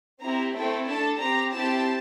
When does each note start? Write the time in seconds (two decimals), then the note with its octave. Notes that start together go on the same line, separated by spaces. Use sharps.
0.21 C4 E4 G4 A#5
0.54 A3 C4 E4 A4 G5
0.87 D4 A4 A5
1.20 C4 G4 A#5
1.53 C4 E4 G4 A5